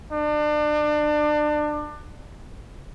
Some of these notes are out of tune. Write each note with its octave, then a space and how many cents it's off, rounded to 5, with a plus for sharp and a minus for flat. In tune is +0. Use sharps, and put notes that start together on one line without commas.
D4 +30